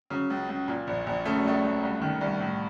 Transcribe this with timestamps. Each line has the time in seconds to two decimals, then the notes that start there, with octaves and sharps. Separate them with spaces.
0.10 C#3 F#3
0.30 C#2
0.49 C#2
0.68 A#2
0.87 A#1
1.06 A#1
1.25 C#3 A3
1.37 F#3
1.45 C#2 A3
1.63 C#2
1.83 C2
2.01 D#3
2.21 C2
2.40 A2